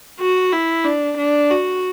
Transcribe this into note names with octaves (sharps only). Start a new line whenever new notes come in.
F#4
E4
D4
D4
F#4